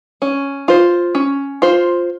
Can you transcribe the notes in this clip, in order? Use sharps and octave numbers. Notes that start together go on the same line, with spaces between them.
C#4
F4 C5
C#4
F4 C5